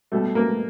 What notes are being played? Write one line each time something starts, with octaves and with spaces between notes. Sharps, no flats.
B2 G3 A3
A#3